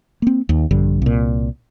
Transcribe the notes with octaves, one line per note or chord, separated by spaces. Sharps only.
A#3 C4
D#2
A#1 G2 D3
C2 A#2